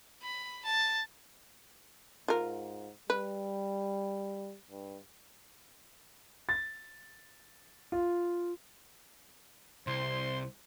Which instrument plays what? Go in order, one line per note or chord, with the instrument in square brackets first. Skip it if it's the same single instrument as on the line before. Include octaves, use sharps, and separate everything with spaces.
[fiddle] B5
A5
[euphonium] G#2 [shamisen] F4 A#4
[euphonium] G3 [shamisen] B4
[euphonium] G2
[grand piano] A6
F4
[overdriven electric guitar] C2 [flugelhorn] C5 [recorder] C6